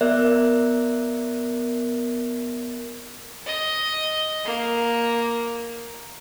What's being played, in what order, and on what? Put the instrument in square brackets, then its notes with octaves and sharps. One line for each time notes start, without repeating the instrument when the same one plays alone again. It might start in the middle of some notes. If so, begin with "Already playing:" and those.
[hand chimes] B3 A#4 D5 E5 F#6
[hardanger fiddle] D#5
A#3